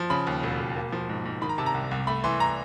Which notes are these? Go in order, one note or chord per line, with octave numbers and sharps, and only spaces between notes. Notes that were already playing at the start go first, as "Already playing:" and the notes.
Already playing: F3
C#3 B5
D#2
E1
E1
A#3
F3
G#2
G#2
D#3 B5
A#5
C3 A5
A#5
C2
C2
A3 B5
E3 C6
A#5